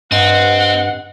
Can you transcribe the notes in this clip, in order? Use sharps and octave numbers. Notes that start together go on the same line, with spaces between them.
G2 C4 D#5 F#5